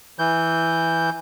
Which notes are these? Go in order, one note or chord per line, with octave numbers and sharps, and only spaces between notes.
E3 G6